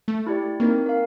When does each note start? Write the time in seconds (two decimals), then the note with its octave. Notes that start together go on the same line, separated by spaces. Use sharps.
0.08 A3
0.27 E4 G4 D5
0.60 A#3 C4 D#4 A#4
0.86 A#4 F5